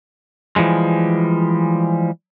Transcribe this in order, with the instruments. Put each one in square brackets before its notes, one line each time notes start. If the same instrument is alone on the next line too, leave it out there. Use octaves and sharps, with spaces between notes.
[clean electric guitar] E3 F3 G3 G#3